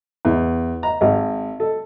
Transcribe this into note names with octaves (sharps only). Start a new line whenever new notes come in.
E2
A#5
G#1
A4